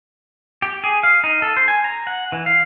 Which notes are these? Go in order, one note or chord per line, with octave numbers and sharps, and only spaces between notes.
G4
G#4
F5
D#4
A4
C5
G#5
A#5
F#5
E3
F5